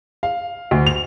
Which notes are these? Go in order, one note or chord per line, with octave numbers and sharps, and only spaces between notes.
F5
D2
F7